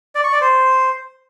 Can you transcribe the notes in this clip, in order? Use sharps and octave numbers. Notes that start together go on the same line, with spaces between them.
D5
C#6
D5
C5